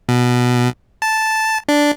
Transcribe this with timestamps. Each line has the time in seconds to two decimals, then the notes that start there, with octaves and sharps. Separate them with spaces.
0.09 B2
1.02 A5
1.68 D4